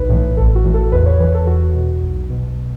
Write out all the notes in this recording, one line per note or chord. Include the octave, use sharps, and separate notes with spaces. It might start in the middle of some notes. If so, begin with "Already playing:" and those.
Already playing: B1 B4
A2 E3
A1 A4
F#4
A2 E3
A4
E2 B4
C#5
E3 B4
A4
E2 F#4
B2
B1
B2